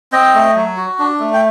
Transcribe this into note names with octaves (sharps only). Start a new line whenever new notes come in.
C4 D#5 G5
A3
F#3
F#4
D4
A3
G5